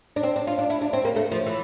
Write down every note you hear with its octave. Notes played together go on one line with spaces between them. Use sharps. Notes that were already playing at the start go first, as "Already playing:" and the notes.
D4
C4
D4
F4
D4
E4
D4
C4
A#3
A3
F3
E3